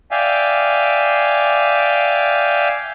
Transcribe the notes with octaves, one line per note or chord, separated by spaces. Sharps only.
D5 E5 F5 G5 G#5